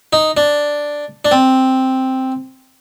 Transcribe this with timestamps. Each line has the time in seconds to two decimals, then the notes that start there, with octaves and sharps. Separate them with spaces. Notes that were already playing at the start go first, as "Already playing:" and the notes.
0.13 D#4
0.37 D4
1.25 D4
1.31 C4